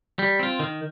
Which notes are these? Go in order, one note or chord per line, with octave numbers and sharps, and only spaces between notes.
G3
C4 F4
D#3